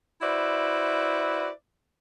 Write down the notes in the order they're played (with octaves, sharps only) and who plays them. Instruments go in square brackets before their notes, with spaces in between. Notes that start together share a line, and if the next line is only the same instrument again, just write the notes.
[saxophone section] E4 F#4 B4 C5 D5 E5